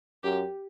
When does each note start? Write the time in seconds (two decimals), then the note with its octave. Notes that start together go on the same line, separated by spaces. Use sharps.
0.24 F#2 G4